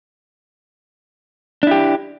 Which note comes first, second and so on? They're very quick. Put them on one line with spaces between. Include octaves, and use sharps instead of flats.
D4 E4 G4